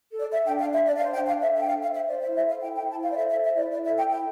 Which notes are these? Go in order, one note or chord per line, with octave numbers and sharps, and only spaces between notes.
A4
D5
A4 E5
D4 G5
F5
D4
E5
D4 D5
F5
C5 E5
G5
D4
F5
A4 E5
D4 E5
G5
F5
A4
F5
C5 E5
C5 D5
E5
E4
E5
A4 F5
E4 G5
G5
E4
A5
C5 F5
D5
A4 E5
E5
C5
E5
E4 D5
E4 D5
E5
A4
G5
E4 G5